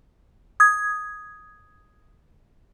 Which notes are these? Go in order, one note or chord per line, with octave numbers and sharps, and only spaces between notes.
D#6 G#6